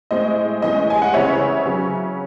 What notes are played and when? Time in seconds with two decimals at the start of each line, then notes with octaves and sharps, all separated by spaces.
0.11 A2 G#3 C4 D#5
0.62 A2 E3 G#3 C#4 D#5
0.90 G#5
1.02 F#5
1.14 C#3 E3 C4 C#5 E5
1.65 C#3 F#3 C#4